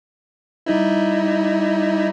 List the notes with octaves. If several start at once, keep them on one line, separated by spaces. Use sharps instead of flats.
G3 D#4 E4